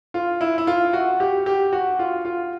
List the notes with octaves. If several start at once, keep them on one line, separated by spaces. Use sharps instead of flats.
F4
E4
E4
F4
F#4
G4
G4
F#4
F4
F4